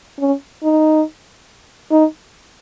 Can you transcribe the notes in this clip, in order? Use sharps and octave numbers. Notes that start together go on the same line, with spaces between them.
C#4
D#4
D#4